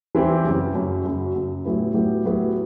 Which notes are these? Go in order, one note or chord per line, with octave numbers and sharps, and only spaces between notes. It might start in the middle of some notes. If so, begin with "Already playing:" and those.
E3 G3 C4 E4 G4
F#2 C#3 F#3
F#2 C#3 F#3
F#2 C#3 F#3
F#2 C#3 F#3
A2 F#3 B3 E4 G4
A2 F#3 B3 E4 G4
A2 F#3 B3 E4 G4